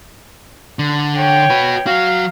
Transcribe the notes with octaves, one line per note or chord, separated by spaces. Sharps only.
D3
C#5 G5
F#4 B4
F#3 F#4 F5